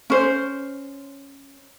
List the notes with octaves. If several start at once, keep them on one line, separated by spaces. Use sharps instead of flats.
C#4 C5